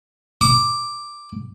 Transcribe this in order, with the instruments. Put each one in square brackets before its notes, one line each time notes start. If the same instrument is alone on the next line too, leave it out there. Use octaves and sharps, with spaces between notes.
[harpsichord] D6